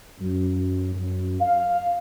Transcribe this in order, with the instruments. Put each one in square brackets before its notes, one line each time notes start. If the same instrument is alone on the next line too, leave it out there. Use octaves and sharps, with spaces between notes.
[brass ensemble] F#2
F#2
F5